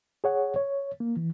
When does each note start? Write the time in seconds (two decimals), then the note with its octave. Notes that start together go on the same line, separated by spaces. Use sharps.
0.24 G#4 C#5 F#5
0.56 C#5
1.00 A#3
1.17 E3